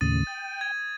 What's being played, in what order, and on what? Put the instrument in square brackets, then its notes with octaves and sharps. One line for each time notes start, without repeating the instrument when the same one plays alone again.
[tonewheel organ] D#2 A2 C#3 [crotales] D#6 A6 D#7
[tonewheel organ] G5
[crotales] G#6